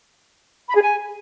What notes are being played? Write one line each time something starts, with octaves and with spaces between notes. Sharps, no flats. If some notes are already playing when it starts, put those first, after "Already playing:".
B5
G#4
G#5